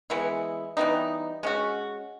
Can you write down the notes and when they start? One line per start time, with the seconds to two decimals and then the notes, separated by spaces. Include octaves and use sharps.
0.10 E3 G#3 B3 E4
0.77 E3 G3 B3 D#4
1.43 G#3 C#4 F#4